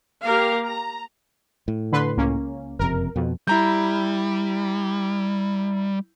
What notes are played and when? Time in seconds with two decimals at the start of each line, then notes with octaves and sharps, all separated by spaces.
0.23 A#3 G4 A#4 F5
0.65 A#5
1.68 A2
1.92 D3 B4 C6
2.17 C#2 A#3 C#4
2.79 F#1 F2 C3 A#4
3.16 F2 B2
3.47 G3 E4 A#5 G6